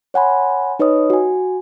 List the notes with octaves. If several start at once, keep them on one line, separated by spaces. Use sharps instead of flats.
C#5 F#5 G#5 B5 C6
D#4 B4 C#5 D#5 D#6
F#4 G#5